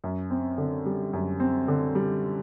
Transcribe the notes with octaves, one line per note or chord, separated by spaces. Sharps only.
F#2
C4
D3
G3
F#2
C4
D3
G3